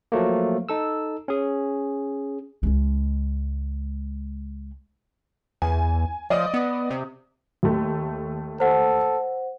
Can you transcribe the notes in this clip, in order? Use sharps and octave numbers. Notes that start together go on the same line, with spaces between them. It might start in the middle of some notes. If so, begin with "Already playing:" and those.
F3 F#3 A3 A#3
D#4 A4 E6
C#4 G#4
C#2 G#3
E2 G#5
F3 D5 D#5 D#6
B3
C3
D#2 A3
A4 C5 F#5